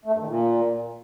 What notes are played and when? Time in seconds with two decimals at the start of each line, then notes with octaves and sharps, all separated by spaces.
0.05 A3
0.12 G2
0.20 D#3
0.27 A#2